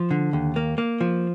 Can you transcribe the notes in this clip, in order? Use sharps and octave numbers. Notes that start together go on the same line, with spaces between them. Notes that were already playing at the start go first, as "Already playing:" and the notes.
Already playing: F3
D3
D#2
A#3
A#3
F3